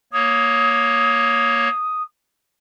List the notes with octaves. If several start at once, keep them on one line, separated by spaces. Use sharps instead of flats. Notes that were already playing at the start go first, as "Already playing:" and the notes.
A#3 C#5 D#6